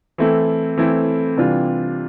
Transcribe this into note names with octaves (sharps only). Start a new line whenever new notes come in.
E3 A3 C4 E4 A4
E3 A3 C4 E4 A4
C3 E3 G3 D4 F4